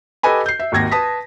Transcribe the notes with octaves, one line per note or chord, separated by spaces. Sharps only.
G4 A4 B4 D#5 G#5 B5
G6 C7
E5
G#1 D#2 G#6 A#6
B4 A5 D#6 B6